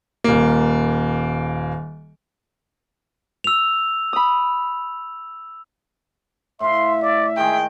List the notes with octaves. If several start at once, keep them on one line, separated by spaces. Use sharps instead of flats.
D#1 A#3
E6 F7
B5 D#6
A2 E5 F5 C6
D5
D#3 G#3 G#4 G5